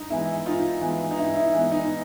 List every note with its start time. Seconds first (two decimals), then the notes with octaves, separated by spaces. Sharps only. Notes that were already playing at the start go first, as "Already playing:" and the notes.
Already playing: G2 D#4
0.10 E3 G#3 B3 E4
0.46 G2 D#4 F4
0.81 E3 G#3 B3
1.11 D#4
1.18 G2 E4
1.36 E4
1.53 E3 G#3 B3
1.71 D#4